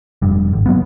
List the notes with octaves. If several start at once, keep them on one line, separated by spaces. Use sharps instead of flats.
F1 G2
G#1
F#3 A#3 B3